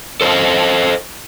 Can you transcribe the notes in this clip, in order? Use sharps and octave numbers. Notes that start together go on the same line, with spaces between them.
A4 C5 C#5 D#5 F5